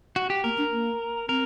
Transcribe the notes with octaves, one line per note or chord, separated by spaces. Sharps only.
F#4
G4
A#3 A#4
D4
A#3
C4 A#4